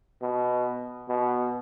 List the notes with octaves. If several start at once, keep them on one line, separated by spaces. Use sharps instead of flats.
B2
B2